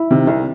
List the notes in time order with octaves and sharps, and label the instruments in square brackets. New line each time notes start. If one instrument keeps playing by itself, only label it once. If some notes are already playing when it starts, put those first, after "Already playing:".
Already playing: [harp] E4
[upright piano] C3 D#3
C2